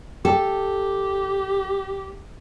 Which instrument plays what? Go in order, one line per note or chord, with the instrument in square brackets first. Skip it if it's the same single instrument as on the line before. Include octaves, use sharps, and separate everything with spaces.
[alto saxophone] G4 [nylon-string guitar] A4 [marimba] G5